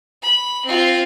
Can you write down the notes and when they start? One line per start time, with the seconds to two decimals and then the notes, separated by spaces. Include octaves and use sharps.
0.22 B5
0.65 C4 F4